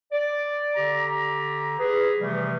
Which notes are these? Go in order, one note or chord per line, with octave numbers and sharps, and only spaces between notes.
D5
D3 G4 A#5
G#4 B4
C3 E3 F3 G3 A3